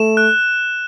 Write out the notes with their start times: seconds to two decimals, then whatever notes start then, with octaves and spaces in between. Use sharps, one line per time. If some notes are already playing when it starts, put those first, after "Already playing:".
Already playing: A3 E7
0.17 F#6